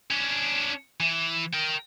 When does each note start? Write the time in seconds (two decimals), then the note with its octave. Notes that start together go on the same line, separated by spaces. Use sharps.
0.10 C#4 D4
1.00 E3
1.54 A#4 G5